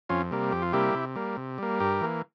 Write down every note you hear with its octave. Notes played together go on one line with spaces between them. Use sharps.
F2 C#4 F4
C3 G3 A#3
F2 G4
F4
C3 G3 A#3 E4 G4
C3
G3 A#3
C3
G3 A#3
G2 G4 A#4
E3 A#3